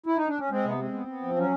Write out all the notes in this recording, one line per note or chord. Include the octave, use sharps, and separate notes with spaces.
E4
D#4
D4
C#4
G#3 C4
C3 B3
G#3 C4
B3
B3
F3
F#3 C#4